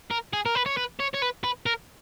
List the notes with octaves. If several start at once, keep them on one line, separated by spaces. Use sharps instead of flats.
A#4
G#4
A#4
B4
C#5
B4
C#5
C#5
B4
B4
A#4